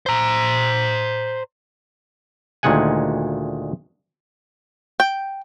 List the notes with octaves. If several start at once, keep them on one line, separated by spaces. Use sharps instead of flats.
C5 A#5
D2 A#2 D#3 G#3 F#5 G#5
G5